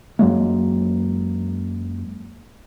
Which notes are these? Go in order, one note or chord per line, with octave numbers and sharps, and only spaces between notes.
F#2 F#3 G#3 A#3